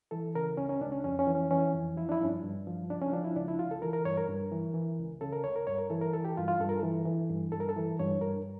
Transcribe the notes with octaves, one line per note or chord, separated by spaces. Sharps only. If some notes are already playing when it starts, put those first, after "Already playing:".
E3 A4
C#3 A#4
C#2 C#4
C#4
C#2 D4
C#4
F2 C#4
C#4
E3
C#4
E3 C#4
F2
F3 E4
D4
E4
G2 C#4
D4
G2
F3
C#2 D4
C#4
F3 D4
E4
C#2 D4
E4
C#2 F4
A4
E3 A#4
A#4
G2 C#5
A#4
G2
E3
E3
C#2
C#3 A4
A#4
C#2 C#5
A#4
G2 C#5
A#4
E3 A4
A#4
E3 A4
G4
G2 F4
F4
G2 A4
A#4
E3 A4
E3
G2
G2 A4
A#4
A4
E3
G2 C#5
G2 A#4